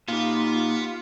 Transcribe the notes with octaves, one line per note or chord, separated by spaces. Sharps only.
A#2 B3 D#4 F4 G4